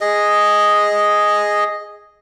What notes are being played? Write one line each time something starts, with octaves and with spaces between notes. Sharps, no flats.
G#4 D#5